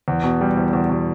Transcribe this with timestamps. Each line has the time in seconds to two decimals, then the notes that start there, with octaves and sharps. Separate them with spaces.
0.08 E2
0.24 B2
0.41 G3
0.57 E2
0.73 E2
0.89 B2